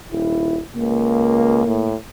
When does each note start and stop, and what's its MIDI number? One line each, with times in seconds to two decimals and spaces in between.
0.12 0.57 27
0.12 0.61 64
0.76 1.65 37
0.76 1.93 58
1.66 1.95 45